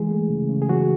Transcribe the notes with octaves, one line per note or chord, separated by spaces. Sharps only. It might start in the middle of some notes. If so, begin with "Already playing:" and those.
Already playing: E3 G#3 G#4
A3
C#3
C#3
G#4
E3 F#3 F#4